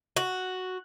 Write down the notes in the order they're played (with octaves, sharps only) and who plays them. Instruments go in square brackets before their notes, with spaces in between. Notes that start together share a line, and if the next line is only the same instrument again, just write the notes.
[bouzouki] F#4